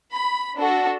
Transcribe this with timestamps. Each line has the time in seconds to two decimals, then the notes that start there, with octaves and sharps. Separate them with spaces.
0.12 B5
0.56 D4 F#4 A4